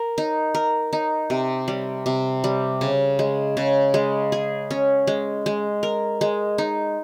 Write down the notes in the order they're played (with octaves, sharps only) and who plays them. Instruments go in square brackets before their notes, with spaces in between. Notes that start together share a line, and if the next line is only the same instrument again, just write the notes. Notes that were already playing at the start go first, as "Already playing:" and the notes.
Already playing: [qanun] A#4
D#4
A#4
D#4
C3
G3
C3
G3
C#3
G#3
C#3
G#3
G#4
C#4
G#3
G#3
A#4
G#3
D#4